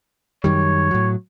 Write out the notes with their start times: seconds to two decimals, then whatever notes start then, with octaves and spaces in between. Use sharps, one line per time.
0.44 F#2 D#3 G3 C#5
0.91 A2 F#3